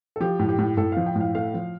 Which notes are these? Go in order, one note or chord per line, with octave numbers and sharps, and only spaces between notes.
A4
F3 G4
A2
G4
A2
A2 A4
F3 F5
G5
A2 F5
A3 F5
F3